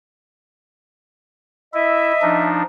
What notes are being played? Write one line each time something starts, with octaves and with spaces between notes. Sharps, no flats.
E4 D#5 E5
F3 D4 D#4